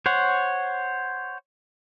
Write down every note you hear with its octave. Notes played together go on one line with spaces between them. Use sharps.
C5 C#5 F#5